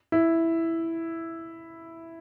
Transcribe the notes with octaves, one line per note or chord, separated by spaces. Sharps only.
E4